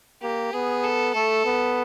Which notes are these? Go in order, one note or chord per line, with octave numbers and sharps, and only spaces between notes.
A#3 G4
B3 G#4
A4
A3 A4
B3